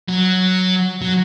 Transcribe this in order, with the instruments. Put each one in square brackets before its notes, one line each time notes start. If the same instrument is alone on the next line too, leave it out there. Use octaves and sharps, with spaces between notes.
[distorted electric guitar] F#3
F#3